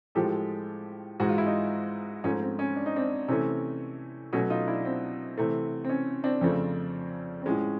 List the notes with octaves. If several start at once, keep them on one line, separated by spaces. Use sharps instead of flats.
A2 F3 G#3 G4 A4
G#2 E3 G#3 F#4
F4
E4
D#4 F4
G#2 F3 A3 C#4
C4
C#4
D4
D#4
C4 D4
C3 E3 A3 C#4
B2 F#3 A3 C#4
D#4 F4
D4 E4
C4
C3 E3 A3
C4
C#4
C4 D4
F2 C#3 F3 A3
C4
A2 F3 G#3 C#4